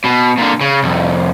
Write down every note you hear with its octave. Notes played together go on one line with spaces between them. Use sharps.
B2
A#2 D3
C#3
C2 F2